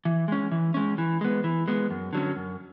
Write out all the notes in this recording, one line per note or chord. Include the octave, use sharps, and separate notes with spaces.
E3
G#3 C#4
E3
G#3 C#4
E3
G#3 B3
E3
G#3 B3
F#2
D3 F#3 C#4
F#2